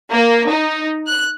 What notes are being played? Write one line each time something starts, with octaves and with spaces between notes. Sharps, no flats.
A#3
D#4
F#6